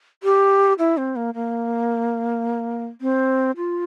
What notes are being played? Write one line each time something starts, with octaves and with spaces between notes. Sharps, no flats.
G4
E4
C4
A#3
A#3
C4
F4